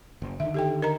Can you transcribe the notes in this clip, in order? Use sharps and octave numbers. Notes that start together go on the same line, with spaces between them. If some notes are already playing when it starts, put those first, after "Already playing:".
F#1
D3 D#3 E5
G4 A4 G5
A#4 D#5 A#5